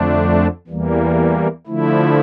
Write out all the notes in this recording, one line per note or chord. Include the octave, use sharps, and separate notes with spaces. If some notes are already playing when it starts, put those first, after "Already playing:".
Already playing: F2 D3 A3 D4
E2 E3 G3 A#3
D3 F3 A3 E4